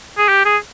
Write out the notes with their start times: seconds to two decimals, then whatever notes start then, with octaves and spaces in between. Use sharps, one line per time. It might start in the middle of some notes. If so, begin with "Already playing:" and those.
0.18 G#4
0.29 G4
0.45 G#4